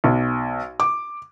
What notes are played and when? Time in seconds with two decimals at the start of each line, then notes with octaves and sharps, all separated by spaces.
0.04 B1
0.80 D6